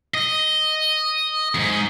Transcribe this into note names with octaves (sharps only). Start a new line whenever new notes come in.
D#5
F2 G#2